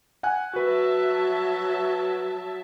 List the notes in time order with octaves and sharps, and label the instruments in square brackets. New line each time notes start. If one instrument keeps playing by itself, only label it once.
[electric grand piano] F#5 G#5 F#6
[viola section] F#3 E5 A5 [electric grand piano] F#4 B4